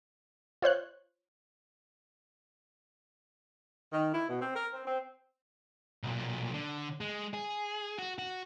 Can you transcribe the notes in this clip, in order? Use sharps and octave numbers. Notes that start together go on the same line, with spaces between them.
F4 C5 C#5 F#6
D#3
E4
B2
C4
A#4
C4
C4
B1 A#2
D3
G#3
G#4
F#4
F#4